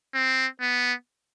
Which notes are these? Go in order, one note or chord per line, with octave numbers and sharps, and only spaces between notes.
C4
B3